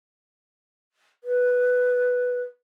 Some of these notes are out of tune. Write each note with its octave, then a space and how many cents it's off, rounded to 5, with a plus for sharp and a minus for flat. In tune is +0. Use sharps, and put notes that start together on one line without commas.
B4 +0